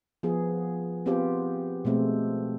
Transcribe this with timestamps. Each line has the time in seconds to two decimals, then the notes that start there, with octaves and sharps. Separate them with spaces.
0.23 F3 B3 G#4
1.06 B3 C4 F4 G4 C5
1.85 B2 G#3 A3 C4